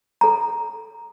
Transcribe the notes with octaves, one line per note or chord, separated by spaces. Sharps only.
A4 A#5